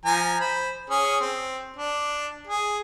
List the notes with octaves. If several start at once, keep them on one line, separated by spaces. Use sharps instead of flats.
F3 G#5 A#5
C5 B5
C#4 G#4
C4
D4
G#4